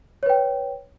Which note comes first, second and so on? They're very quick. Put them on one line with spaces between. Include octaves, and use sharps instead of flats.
C#5 B4 G5